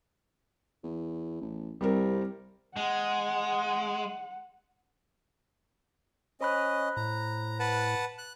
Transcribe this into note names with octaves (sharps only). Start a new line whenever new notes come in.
E2
A1
C2 G3 C4 A#4
G#3 F#5
C#4 C5 D#5 B5 F#6
A2 A#5
B4 F#5 A5
F#6